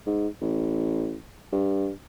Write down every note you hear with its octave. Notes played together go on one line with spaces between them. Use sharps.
G#2
A1
G2